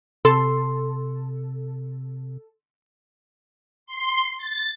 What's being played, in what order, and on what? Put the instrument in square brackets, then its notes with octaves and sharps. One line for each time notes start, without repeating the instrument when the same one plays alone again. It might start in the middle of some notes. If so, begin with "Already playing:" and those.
[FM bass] C3 [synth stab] A4 [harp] C6
[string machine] C6
A6